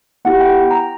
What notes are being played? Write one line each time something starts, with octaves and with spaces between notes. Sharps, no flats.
B3 E4 G4 F#5
G5
A#5